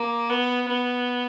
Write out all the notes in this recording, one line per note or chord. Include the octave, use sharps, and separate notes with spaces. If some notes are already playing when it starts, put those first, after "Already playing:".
Already playing: A#3
B3
B3